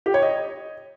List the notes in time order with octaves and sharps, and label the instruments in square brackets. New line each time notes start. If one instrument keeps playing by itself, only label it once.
[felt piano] G4
C#5
D#5